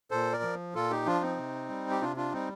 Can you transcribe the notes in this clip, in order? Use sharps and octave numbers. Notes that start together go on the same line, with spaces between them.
A#2 A4 C5
A#4 D5
F3
A#2 F4 A4
D#4 G4
F3 D4 F4
C4 D#4
C3
G3
G4
C3 D4 F4
D4 F4
G3 C4 D#4